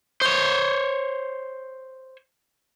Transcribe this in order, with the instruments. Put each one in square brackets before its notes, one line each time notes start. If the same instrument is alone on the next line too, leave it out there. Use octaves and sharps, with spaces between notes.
[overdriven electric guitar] C5 C#5